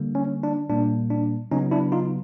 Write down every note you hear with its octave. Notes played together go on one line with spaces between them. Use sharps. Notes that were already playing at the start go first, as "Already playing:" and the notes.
Already playing: D3 G3 A#3
C#4
D4
A#2 G3 A#3 D4
D4
C#3 F#3 B3 C#4 D#4
D4 E4
D#4 F4